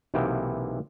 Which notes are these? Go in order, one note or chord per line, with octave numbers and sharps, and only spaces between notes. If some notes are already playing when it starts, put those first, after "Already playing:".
B1 C3 E3 A#3 B3 G5